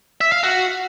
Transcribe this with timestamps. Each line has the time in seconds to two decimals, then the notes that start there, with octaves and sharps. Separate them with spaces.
0.21 E5
0.32 F5
0.43 F#4